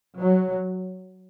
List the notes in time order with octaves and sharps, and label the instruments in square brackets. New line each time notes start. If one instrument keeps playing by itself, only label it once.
[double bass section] F#3